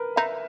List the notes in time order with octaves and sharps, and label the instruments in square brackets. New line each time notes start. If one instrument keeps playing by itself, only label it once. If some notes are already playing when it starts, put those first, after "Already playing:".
Already playing: [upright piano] A#4 B4
[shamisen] D#4 [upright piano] E5